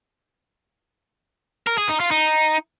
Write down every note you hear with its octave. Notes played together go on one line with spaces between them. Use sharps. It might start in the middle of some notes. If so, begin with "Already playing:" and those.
A#4
G#4
D#4
F4
D#4